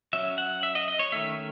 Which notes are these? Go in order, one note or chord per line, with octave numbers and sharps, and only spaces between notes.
F#3 C#4 E5
F#5
E5
D#5
D#5
C#5
D#3 A3 C#4 E5